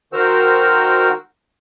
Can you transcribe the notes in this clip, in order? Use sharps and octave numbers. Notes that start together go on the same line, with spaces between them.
D#3 F#4 A#4 C5 E6 F6